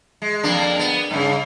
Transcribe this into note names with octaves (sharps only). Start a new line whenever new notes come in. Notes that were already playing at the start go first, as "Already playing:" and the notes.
G#3
F2 A#3 D4
B3
G2 C#3